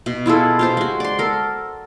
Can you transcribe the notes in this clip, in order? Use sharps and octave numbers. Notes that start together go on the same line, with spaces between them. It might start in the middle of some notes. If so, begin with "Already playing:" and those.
B2
E4 F4 G#4 A4
F4 G4 C5
G#3 F#4
D5 C6
A4 A#4